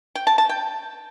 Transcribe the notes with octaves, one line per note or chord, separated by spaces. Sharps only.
G5
A5
A5
G5